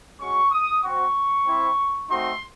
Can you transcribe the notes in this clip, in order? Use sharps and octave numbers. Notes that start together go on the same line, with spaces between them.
G#3 C#4 F#4 C#6
D#6
C4 F#4 C#6
C4 E4
A3 C4 D#4 F#4 C6